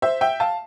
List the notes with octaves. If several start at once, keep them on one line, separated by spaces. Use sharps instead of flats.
C5 E5
E5 G5
F5 A5